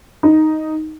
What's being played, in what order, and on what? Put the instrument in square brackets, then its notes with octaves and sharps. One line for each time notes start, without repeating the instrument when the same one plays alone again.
[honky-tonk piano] D#4